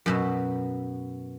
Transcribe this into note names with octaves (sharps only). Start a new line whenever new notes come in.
F#2 B2 E5